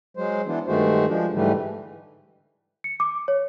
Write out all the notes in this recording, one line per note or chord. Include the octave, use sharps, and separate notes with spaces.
F#3 G#3 C5
E3 B3 D4
G2 D#3 G#3 A3 F#4 C5
F3 G#3 D4
G#2 D3 E3 G3 A3
C#7
D6
C#5